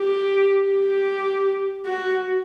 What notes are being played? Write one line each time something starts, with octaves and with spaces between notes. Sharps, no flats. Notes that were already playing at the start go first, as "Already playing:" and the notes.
Already playing: G4
G4
F#4